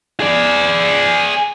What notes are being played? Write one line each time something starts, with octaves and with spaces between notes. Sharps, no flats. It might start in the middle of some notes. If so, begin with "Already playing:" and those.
G#4 D5